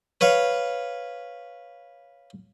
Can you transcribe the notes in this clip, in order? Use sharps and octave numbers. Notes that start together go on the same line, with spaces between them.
B4 C#5 F5